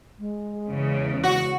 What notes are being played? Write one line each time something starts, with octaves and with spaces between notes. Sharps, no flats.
G#3
E2 C#3
F#4